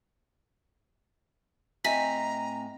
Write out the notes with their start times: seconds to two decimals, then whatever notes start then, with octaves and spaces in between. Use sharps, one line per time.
1.84 A2 C4 D#5 E5 G#5 A#5 B6